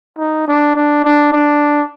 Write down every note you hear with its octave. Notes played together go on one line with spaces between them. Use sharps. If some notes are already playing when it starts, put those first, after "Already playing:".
D#4
D4
D4
D4
D4